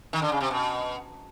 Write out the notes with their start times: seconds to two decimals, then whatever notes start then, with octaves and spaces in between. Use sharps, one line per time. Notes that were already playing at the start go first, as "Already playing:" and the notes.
0.13 D#3
0.22 D3
0.32 C#3
0.40 C3
0.51 B2